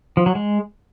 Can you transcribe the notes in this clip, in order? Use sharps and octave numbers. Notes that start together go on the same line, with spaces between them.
F3
F#3
G#3